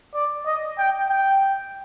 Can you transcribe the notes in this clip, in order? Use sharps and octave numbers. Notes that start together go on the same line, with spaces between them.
D5
D#5
G5
G5